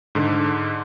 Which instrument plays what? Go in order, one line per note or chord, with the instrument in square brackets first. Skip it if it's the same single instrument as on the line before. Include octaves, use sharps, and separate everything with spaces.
[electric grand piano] G#2 D3